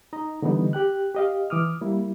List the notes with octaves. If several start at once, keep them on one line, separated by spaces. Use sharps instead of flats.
D#4 D#5 A#5
D3 E3 G3 B3 D#4
G4 G5 F#6
G4 D#5 F5
E3 D6 D#6 F6
G3 A#3 E4